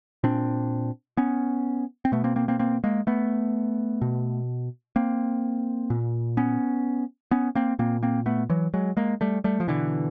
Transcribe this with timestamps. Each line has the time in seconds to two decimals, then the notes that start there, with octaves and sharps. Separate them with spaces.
0.23 A#2 C4 D4
1.17 B3 C#4
2.05 C4
2.12 B2 A3 B3
2.24 A#3 C4
2.36 A#3 C4
2.48 A#3 C4
2.59 A#3 C4
2.84 G#3 A#3
3.07 A3 B3
4.02 B2
4.96 A#3 C4
5.90 A#2
6.37 B3 C#4
7.31 B3 C#4
7.55 A#3 C4
7.79 A#2 A#3 C4
8.03 A#3 C4
8.26 A3 B3
8.50 E3 F#3
8.74 F#3 G#3
8.97 G#3 A#3
9.21 G3 A3
9.44 G3 A3
9.60 F3
9.68 B2 D3 E3